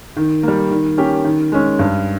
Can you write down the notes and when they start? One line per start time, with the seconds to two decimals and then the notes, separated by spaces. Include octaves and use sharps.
0.17 D#3
0.43 G3 A#3
0.71 D#3
0.97 A#3 C#4 G4
1.25 D#3
1.52 G#3 C#4
1.79 G2